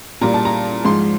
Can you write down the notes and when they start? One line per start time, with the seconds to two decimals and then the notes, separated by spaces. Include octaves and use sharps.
0.21 A#2 G3 A#5
0.34 A5
0.45 A#5
0.85 G#2 F3 G#3 C6